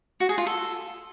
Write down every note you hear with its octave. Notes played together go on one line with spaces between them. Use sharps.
F#4
G#4
F4
A4